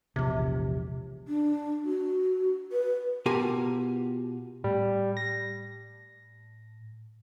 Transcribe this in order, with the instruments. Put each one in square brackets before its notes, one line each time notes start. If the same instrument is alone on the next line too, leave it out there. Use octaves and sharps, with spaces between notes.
[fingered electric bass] E1 A#1 [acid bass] C3
[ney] D4
F#4
B4
[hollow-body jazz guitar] B2 F4 G4 A#4 G#5 A5
[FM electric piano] A2 [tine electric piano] G3
[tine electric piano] A#6